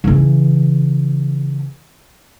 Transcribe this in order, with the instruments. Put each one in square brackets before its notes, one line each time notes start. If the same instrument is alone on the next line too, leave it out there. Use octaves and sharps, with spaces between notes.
[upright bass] C#3 E3